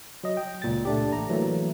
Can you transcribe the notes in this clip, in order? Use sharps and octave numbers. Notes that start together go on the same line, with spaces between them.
F#3 D#5
G5
C#2 A#2 A6
A3 D4 G4
A1 A#5
E3 F#3 A3 A#3